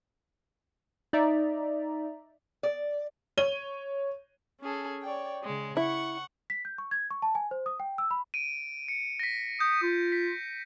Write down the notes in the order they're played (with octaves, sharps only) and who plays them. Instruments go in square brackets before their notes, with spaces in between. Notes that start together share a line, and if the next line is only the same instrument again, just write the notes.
[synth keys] D#4 D5 E5 A#5
[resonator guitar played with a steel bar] D5
[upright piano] C#5 D#7 G7
[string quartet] C#4 G#4 A4
C#5 D5 G5
C#3 G#3
[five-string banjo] E4 [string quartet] F#5 C#6
[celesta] B6
G6
C#6
G#6
C#6
A5
G#5
C5
D#6
G5
E6
B5
[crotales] D7 D#7
C#7
A#6 B6
[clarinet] D#6 [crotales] G6
[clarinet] F4
[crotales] B6